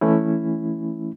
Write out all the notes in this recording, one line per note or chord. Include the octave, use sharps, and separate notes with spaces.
E3 A3 C#4 E4